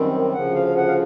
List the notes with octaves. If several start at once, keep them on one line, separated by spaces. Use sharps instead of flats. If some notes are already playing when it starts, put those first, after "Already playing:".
Already playing: F#2 D#3 G3 C4
D2 C#3 F3 F#5
F5
F#5
F5